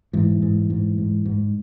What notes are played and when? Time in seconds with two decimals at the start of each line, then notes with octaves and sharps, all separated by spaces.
0.13 G#2 E3
0.42 G#2
0.70 G#2
0.98 G#2
1.26 G#2